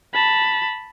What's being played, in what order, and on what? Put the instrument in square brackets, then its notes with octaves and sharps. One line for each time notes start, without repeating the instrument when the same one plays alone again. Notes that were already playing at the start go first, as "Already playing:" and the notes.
[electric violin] A5 B5